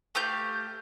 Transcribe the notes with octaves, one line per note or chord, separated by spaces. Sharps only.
A3 G4 F5 G6